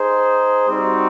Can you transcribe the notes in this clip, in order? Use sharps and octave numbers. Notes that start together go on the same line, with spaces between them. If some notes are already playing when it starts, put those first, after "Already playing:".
Already playing: D#4 G#4 C5
G3 C4 D#4 F#4